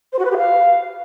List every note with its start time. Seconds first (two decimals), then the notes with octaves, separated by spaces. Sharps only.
0.13 C5
0.19 F#4
0.25 B4
0.31 G4
0.37 F5